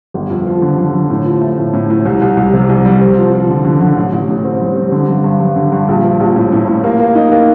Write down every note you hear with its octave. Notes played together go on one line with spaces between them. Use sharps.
G1
F2
F3
D3
D3
D3
A2
F3
A3
A2
A2
A2
C2
C2
C2
C3
C2
G3
C4
F3
F3
D3
D3
D3
A1
A1
A2
C4
G3
C4
D3
G2
G2
G2
D3
G2
A#1
F3
A#1
A2
A2
A2
A#3
A#3
D#4
A#3